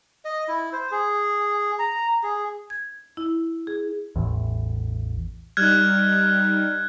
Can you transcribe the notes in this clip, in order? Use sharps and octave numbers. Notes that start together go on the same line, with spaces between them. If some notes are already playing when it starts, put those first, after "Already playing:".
D#5
E4
C5
G#4
A#5
G#4
G#6
E4
G#4
A1 E2
G3 D#4 F6 F#6 G#6